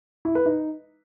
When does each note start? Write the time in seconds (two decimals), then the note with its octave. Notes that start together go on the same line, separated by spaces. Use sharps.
0.25 E4
0.35 B4
0.46 D#4